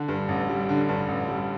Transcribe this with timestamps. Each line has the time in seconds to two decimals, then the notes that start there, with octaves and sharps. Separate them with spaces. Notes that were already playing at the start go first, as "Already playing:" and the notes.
Already playing: D3
0.08 G2
0.29 A1
0.49 G3
0.69 D3
0.89 G2
1.08 A1
1.28 G3